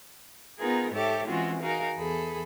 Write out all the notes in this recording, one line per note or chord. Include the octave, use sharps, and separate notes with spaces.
B3 D#4 F4 G#4 A#4
G#2 G4 A4 C#5 E5 D6
E3 G#3 C4 C#4 F4 F#4
D#4 F#4 G#4 A#4 F5
E2 G#4 A4 B5